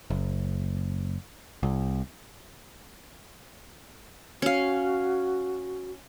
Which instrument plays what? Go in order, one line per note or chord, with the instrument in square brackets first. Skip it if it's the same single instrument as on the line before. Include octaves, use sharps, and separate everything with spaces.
[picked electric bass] F#1
C2
[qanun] C#4 F5 [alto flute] F#4